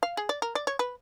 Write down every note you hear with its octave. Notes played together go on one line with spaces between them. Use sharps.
F5
G#4
D5
A#4
D5
C#5
B4